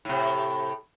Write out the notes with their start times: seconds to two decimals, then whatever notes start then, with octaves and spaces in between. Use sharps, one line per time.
0.05 A2 C3